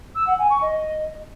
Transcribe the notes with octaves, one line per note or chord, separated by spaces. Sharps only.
E6
F#5
G#5
C#6
D#5